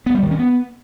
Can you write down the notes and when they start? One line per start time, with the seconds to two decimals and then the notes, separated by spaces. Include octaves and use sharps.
0.06 B3
0.15 G3
0.23 D#3
0.31 C#4
0.39 B3